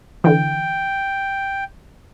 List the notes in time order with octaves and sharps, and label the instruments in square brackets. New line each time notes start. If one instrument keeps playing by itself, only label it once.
[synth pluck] D3 E3 [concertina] G5